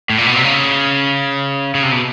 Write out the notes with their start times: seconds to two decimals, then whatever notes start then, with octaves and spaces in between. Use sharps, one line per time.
0.10 A2
0.18 A#2
0.27 B2
0.36 C3
0.44 C#3
1.75 C#3
1.83 C3
1.92 B2